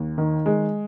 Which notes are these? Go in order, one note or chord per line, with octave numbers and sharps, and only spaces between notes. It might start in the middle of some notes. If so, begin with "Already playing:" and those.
Already playing: D#2
D#3
G#3